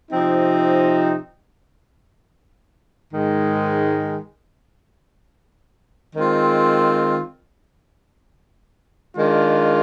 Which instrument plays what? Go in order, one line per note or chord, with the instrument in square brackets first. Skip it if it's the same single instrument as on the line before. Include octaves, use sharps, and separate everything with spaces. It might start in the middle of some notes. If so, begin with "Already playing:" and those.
[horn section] C3 F3 C4 D#4
G#2 D#3 G#3
D#3 G#3 C4 F4
D#3 G#3 D4 F4